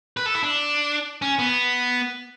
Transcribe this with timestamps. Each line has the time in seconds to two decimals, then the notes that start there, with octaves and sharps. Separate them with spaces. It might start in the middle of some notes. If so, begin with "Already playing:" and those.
0.17 B4
0.26 A4
0.35 E4
0.43 D4
1.22 C#4
1.39 B3